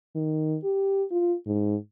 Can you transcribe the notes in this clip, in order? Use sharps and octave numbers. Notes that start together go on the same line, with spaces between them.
D#3
G4
F4
G#2